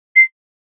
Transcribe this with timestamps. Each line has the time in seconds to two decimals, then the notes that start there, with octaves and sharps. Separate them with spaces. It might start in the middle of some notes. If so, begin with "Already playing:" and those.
0.16 C7